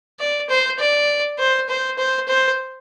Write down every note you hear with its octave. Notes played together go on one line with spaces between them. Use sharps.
D5
C5
D5
C5
C5
C5
C5